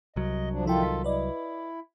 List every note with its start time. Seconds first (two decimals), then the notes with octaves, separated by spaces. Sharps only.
0.16 C2 F#3 D#5
0.51 F3 D4
0.66 D#3 F3 E4 F4 A4 G5
0.83 B6
1.04 E4 B4 D5 D#5